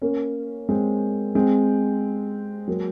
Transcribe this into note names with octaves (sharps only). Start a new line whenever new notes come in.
A#3 C#4
G#3 C4
G#3 C4
F#3 A#3